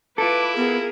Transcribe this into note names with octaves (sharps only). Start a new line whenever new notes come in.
E4 F4 A4 B4 D6
B3 G#4 A#4